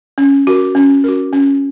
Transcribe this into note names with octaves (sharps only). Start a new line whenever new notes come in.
C#4
F#4 A#4
C#4
F#4 A#4
C#4